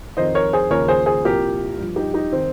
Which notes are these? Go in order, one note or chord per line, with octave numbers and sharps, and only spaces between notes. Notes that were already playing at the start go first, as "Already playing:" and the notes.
F2 D#3 C5 D#5
A#4 C#5
G#4 C5
D#2 C#3 F3 A#4 C#5
G#4 C5
G#4 C5
C2 A#2 F3 G4 A#4
G2 F3
D#4 G4
D#4 G4
D#3 C4